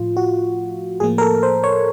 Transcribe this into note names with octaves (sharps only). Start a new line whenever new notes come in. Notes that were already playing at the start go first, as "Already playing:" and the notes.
Already playing: A2 F3 F4
F#4
A2 F3 A#3 G#4
A#4
A4
C5
C#5